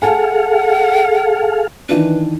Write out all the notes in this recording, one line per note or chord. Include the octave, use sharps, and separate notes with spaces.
G#4 A4 F5 F#5 G#5 A5
D#3 E3 D4 B4